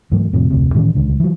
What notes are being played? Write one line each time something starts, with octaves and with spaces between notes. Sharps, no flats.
G#2 E3 F#3 A3
F2 A2 C3 F3
F1 D2 C3
A2 D#3 E3 C#4
D#1 C#2 D3
E3 F#3